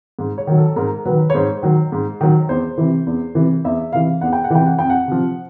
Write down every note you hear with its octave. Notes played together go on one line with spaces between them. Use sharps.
G#2
C#5
D#3 F#3
A4
G#2 A#4
D#3 F#3 B4
C#5
G#2 C5
D#3 F#3
G#2
D#3 F#3
E2 C5
C3 E3
E2
C3 E3
E2 E5
C3 E3 F5
E2 F#5
G5
F#5
C3 E3 G5
F#5
F2 G5
F#5
C3 F3